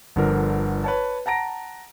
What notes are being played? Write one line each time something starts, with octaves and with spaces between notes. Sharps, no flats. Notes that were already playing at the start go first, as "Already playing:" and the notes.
G1 D3 F3 A#4
B4 C#5 A5
F#5 A5 A#5 A#6 D7